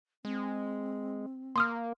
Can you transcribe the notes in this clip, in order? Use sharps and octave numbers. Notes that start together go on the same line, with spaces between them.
G#3 C4
A#3 C6 D#6 F6